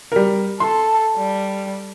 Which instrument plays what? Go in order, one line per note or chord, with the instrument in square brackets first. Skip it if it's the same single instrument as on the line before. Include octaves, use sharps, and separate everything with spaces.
[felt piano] G3 A#4
[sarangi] A4 [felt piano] C6
[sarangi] G3